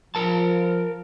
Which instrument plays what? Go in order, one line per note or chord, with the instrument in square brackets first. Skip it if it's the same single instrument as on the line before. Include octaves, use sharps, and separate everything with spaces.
[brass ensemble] F3 [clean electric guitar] A#4 A5